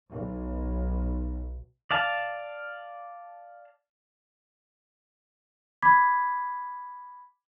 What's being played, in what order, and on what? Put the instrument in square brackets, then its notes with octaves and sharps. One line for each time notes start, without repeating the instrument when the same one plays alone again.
[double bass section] B1
[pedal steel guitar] D5 F5 A5
[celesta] B5 D6 G#6 B6